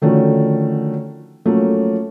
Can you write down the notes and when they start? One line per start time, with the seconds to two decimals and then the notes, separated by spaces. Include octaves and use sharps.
0.02 D3 D#3 F3 A3 C#4 F#4
1.45 F3 F#3 A3 A#3 C#4